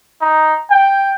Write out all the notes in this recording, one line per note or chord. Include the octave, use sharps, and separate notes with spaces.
D#4
G5